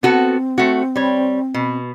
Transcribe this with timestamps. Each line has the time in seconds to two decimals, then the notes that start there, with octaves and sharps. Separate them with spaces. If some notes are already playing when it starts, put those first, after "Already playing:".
0.03 B3 C4 F#4 A4
0.58 A3 F#4
0.96 G3 C#5
1.54 B2